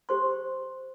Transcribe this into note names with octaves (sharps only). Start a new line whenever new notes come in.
G4 C5 C6